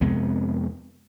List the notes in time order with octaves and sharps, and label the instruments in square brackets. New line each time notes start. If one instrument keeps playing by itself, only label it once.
[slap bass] F2 C3 G#3 B3